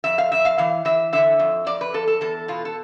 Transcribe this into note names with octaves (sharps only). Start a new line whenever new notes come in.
F2 E5
F5
F2 E5
F5
E3 F5
E3 E5
D3 E5
F2
F2 D5
B4
F2 A4
A4
E2 A4
B2 F4
A4